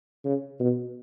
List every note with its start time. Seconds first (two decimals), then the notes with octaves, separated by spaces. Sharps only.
0.25 C#3
0.60 B2